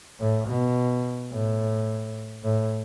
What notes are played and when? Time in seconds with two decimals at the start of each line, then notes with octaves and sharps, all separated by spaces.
0.20 A2
0.48 B2
1.33 A2
2.44 A2